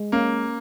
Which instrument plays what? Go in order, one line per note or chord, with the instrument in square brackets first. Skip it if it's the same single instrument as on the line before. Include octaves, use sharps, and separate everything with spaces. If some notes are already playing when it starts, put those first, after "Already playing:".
Already playing: [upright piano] G#3
[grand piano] A#3 [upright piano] C#4